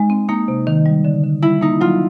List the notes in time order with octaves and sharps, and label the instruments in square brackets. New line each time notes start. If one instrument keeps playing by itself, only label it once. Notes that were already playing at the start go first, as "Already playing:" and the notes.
Already playing: [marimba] G#3 [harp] D#4
[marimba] C4
[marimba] A#3 [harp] D#4
[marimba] C3
D#3
G3
D3
D3
[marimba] G3 [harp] E4
[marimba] A#3 [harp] D#4
[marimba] F#3 [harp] F4